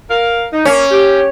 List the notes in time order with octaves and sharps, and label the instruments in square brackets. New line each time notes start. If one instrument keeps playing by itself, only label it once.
[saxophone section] A#4 F5
D#4
[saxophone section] A#3 [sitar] C#4
[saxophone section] G4